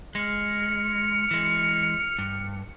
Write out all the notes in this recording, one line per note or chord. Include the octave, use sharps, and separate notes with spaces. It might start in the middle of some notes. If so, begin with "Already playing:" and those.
G#3 F6 C#7
E3 G#3
G2